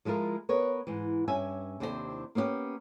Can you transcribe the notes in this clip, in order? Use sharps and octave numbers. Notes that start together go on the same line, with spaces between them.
F3 G#3 E4 F4 A#4
B3 A#4 B4 C#5
G#2 E3
G2 C#4 E5 G#5
D#2 C3 D4 E4 G#4 C5
A#3 B3 C#4 D#4 G4